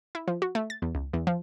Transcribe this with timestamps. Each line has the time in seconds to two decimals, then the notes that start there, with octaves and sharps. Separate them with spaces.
0.15 E4
0.28 F3
0.42 F#4
0.55 A3
0.70 A6
0.82 E2
0.95 C#2
1.13 E2
1.27 F3